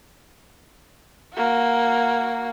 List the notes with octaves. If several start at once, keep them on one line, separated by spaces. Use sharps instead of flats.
A#3 F#4